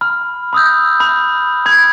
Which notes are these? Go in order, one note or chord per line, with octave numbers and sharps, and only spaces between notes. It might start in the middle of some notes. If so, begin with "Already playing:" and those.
B5 F6
B5 D#6 E6 G6
B5
B5 G#6